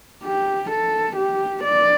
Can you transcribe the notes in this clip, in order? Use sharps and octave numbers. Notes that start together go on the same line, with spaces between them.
G4
A4
G4
D5